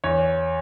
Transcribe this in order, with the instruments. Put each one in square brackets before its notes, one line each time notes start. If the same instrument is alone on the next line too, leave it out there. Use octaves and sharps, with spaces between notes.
[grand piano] E2 C#5